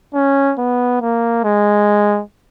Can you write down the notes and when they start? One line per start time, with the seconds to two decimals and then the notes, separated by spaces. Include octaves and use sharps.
0.14 C#4
0.58 B3
1.01 A#3
1.44 G#3